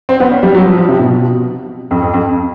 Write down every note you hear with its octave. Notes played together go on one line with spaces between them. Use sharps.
C4
B3
C#4
G3
F#3
F3
F3
C3
B2
F2
F2
F2